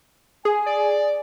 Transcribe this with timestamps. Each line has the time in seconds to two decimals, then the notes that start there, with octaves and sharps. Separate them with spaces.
0.45 G#4 G#5
0.66 D5